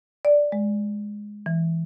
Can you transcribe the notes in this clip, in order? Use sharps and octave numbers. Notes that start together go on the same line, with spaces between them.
D5
G#3
E3